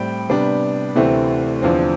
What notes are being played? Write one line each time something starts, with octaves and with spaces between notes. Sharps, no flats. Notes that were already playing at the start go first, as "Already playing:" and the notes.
Already playing: A2 G3 C4 E4 G5 B5
C3 G3 B3 D4
D2 C3 E3 A3 C4
E2 D3 F3 C4